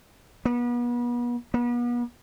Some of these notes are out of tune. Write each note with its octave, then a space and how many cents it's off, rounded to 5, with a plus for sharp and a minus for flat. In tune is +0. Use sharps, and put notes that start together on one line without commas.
B3 -35
B3 -40